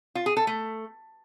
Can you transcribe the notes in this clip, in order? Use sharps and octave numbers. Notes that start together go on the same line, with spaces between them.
F4
G#4
A4
A3